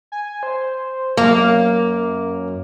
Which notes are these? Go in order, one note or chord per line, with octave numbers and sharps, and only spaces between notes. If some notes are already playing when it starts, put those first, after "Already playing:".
G#5
C5
F#2 A#3